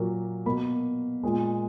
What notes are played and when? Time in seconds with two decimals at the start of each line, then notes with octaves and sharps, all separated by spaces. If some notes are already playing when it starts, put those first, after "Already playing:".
Already playing: A#2 F#3 A#3
0.46 B2 A#3 B5
1.23 A#2 G#3